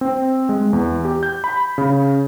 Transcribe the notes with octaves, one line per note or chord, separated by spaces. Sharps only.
C4
G#3
E2
G4
G6
B5
C#3